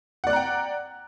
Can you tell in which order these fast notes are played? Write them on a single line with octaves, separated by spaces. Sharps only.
F#5 D5 F#6 A#5 G5